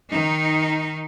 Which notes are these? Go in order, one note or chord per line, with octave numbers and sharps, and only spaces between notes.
D#3 D#4